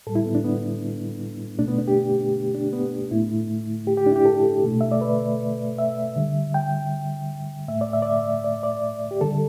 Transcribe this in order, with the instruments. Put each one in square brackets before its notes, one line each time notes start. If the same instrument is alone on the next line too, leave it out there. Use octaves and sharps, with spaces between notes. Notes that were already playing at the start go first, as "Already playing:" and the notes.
[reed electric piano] A2 A4
G3
E4
B3
D4
B3
B2 A3 D4
B3
D4
G4
D4
B3
A2 A3 E4
G4
G4
D4
E4
G4
A4
B2 A3
E5
D5
B4
E5
D3 G3
G5
A2 A3 E5
D5
E5
D5
E5
D5
D5
G4
D3 G3 A4